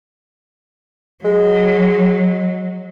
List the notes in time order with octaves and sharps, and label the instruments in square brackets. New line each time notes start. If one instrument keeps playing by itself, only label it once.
[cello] F#3 [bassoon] G#3